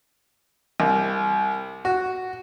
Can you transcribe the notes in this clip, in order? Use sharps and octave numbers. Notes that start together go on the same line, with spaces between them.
C2
F#4